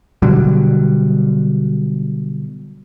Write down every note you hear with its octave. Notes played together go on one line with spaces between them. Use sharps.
B2 D3 F#3 G3